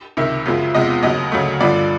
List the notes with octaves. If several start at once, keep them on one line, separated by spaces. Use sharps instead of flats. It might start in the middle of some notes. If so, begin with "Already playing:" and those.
C#2 C3 D#3 E5
F#2 C#3 F3 G#3
E2 C3 F3 G#3 D#5
D#2 C#3 F#3 D#5
D2 C#3 F#3 A3
G2 D3 F3 D5